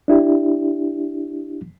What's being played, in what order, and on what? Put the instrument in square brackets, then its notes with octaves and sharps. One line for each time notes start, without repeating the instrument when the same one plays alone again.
[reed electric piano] D4 E4 G4